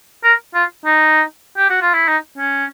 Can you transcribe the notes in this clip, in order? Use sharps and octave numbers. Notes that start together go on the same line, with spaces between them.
A#4
F4
D#4
G4
F#4
F4
E4
D#4
C#4